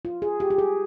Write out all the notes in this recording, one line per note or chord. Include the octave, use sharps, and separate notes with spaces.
F4
G#4
G4
G4
G#4